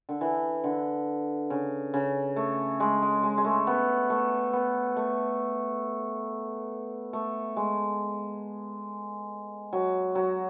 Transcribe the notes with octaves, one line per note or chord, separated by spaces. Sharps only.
D3
E3
D3
C#3
C#3
A3
G#3
G#3
G#3
G#3
A3
B3
A3
B3
A3
A3
G#3
F#3
F#3